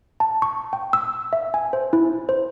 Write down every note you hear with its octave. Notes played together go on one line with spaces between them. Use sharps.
A5
C#6
G5
E6
E5
G#5
C5
E4
C5